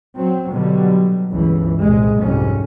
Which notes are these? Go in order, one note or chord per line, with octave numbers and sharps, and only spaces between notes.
F#3 C4
B2 D3 F#3 G3
G1 C#2 E3
C2 A#2 G#3
C2 F2 G#2 C#4